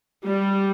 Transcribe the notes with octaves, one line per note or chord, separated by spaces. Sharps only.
G3